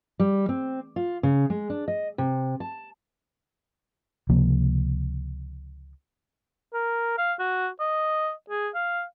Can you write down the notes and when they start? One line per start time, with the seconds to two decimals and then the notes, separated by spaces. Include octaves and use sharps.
0.19 G3
0.49 C4
0.96 F4
1.23 C#3
1.50 G#3
1.70 D4
1.88 D#5
2.18 C3
2.60 A5
4.29 C#2 C3 F3 A#3
6.74 A#4
7.18 F5
7.39 F#4
7.80 D#5
8.50 G#4
8.75 F5